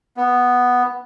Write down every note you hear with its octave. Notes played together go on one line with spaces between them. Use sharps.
B3